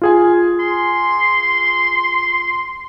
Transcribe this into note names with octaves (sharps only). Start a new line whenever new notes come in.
F4 G#4 G#5
C6